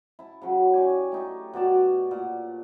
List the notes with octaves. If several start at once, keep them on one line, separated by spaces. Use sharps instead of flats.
E4 A5
C#3 F#3
G4 C#5 D5 G#5
A3 D#4 G4
B2 F#4 D5 A5
A#2 F#5